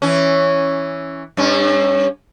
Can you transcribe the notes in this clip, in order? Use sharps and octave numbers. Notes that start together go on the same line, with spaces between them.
E3 C#4
G2 C#4